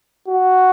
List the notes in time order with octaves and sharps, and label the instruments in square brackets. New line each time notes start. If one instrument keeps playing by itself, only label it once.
[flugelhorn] F#4